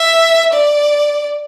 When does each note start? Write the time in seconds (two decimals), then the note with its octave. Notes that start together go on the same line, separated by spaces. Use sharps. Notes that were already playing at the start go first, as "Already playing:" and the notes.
Already playing: E5
0.53 D5